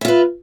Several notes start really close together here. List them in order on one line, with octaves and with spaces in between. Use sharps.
E5 F4 B4